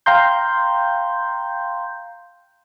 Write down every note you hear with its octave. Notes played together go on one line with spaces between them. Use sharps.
F5 G5 A#5 C6 G6